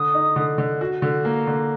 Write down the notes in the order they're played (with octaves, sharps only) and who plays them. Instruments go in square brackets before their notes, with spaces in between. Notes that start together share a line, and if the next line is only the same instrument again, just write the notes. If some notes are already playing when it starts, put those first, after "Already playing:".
Already playing: [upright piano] D3 [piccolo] D#6
[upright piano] D#4
D3
D3
F#4
D3
A#3
D3